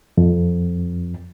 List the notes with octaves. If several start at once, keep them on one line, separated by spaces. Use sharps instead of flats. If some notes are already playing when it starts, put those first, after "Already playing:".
F2